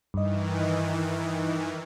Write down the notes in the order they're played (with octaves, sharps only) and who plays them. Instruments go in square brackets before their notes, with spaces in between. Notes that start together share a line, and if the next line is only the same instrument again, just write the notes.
[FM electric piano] G2 D#5 [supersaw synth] D#3 E3